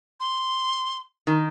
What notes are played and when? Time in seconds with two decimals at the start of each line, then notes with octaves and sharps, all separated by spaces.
0.20 C6
1.27 D#3